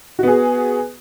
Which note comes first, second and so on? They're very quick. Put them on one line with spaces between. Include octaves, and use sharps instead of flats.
F#4 B3 G#4